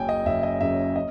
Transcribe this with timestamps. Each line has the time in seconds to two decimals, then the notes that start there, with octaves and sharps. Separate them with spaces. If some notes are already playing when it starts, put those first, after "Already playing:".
Already playing: F#1 F#2 C#3 G5 G#5
0.09 D#5
0.25 F#1 E5
0.43 D#5
0.61 F#2 C#3 E5
0.96 D#5